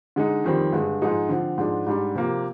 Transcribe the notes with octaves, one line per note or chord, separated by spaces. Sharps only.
D3 G#3 D#4
F2 D#3 G3 C4
G2 D3 G#3
G#2 F3 G#3 D#4
D3 F3 C4
G#2 F3 G#3 D4
G#2 G3 D4
C3 F3 A#3